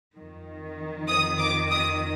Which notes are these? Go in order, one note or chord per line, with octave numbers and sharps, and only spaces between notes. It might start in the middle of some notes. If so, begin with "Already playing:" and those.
F2 D#3
D#6
D6
D#6